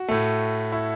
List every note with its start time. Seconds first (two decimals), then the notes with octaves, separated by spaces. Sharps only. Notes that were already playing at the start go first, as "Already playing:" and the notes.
Already playing: F#4
0.08 A2 A3
0.72 E4